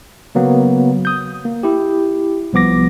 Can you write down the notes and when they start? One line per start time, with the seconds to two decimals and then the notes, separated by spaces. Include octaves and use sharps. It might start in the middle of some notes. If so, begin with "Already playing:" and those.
0.35 C#3 F#3 A#3 B3
1.05 D#6 G6
1.45 A#3
1.63 E4 G4
2.53 C2 F3 B3 D6 A#6